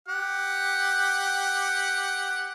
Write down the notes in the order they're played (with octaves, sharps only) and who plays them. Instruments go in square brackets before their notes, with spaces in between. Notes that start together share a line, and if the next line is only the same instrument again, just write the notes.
[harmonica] G4 F#5